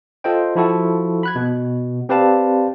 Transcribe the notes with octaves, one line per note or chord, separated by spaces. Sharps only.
F4 A4 C5 D#5 G5
F3 E4 F#4 A4
B5 F#6 G#6
B2
C4 G4 B4 D5 F5 A5